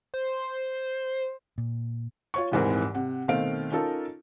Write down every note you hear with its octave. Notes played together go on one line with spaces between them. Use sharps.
C5
A#2
F4 C#5 C#6
D#1 G#1 G#2 E3 C4 A#4
C3 F#5
B2 D#3 A3 C4 F5 D7
C#4 D#4 F4 A4 A#4